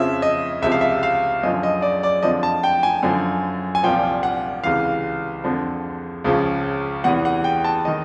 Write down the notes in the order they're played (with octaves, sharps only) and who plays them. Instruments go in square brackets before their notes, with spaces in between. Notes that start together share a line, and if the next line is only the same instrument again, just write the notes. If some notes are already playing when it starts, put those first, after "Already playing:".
Already playing: [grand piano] F2 C#3 F3 E5
D#5
C#2 C3 F3 E5
F5
E5
F5
F#2 D3 F3 D#5
D#5
D5
D5
F2 D3 F3 D#5
A5
G5
G#5
F#2 D3 F3
G#5
C2 A#2 F3 G5
F#5
C#2 C3 E3 F5
F2 D3 F3
C#2 C#3 F3
E2 C3 E3 F#5
F#5
G5
A5
D#3 D#5